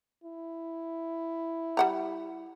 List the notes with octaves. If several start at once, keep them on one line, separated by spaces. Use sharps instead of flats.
E4
G3 F#5 A#5